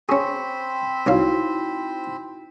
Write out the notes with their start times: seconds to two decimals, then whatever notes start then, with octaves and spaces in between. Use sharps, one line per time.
0.09 C4 C#4 G#4 C5 B5 C#6
1.07 C2 D#4 E4 F#4 C#5 F5